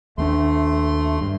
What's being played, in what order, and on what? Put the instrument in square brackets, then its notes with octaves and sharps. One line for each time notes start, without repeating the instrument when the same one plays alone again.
[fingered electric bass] D#2 B3 D4 [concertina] A3 C6
[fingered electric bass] G2